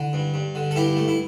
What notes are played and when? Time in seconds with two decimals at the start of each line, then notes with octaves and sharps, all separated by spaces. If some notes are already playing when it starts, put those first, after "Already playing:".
Already playing: D3 E4
0.13 G2
0.34 G2
0.55 D3
0.71 A4
0.76 G2 E4 G4
0.97 A3
1.08 E4